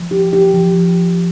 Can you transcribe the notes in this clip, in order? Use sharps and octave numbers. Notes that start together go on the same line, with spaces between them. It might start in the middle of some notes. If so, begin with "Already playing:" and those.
Already playing: F3
G4
G4
F3